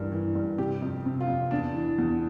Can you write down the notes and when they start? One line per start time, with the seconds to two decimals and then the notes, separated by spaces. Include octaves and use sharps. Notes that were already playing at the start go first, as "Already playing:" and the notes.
Already playing: G2 E3 A#4
0.12 E3
0.35 G2
0.58 C3 G4
0.82 F2
1.06 C3
1.21 F4
1.28 F2
1.51 E2 D4
1.74 E3
1.98 E2